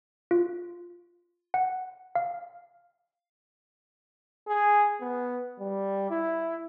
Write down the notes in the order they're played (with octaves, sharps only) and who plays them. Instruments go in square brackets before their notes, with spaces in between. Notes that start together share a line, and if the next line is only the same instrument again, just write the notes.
[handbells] F4
F#5
F5
[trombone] G#4
B3
G3
E4